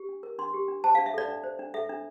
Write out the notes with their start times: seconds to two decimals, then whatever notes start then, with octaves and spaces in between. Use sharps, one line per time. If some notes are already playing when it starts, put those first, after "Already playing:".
Already playing: G4
0.09 D4
0.23 A#4
0.39 D4 C6
0.54 G4
0.68 D4
0.84 C5 A5
0.95 F5
0.98 D4
1.06 E5
1.14 A4 D5
1.28 D4
1.44 C5
1.59 D4
1.74 A4 E5
1.89 D4